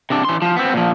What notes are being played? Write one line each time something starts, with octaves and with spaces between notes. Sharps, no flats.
C3 D4
E3 C6
F3
B3 C4
A#2 F3